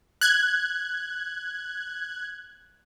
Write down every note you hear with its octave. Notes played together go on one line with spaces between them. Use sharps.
F#6 G#6